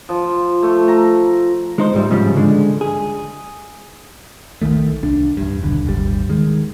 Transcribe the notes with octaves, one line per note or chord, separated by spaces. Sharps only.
F3
A3
A#5
G#3 D#4 C5
G#2 G3 E4
G#2 C#3 F3 G3
D3 G#3
G#4
A#1 D#2 D#3 A3
C2 D4
E2 G2
D#1 B1 D3
D#1 G#1 G3
D#3 G#3